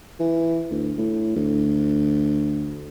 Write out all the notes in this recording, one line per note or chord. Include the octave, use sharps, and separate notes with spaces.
E3
D2
A2
D2